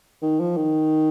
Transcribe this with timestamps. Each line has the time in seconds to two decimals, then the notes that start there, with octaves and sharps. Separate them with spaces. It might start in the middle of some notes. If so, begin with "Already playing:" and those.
0.22 D#3
0.40 F3
0.57 D#3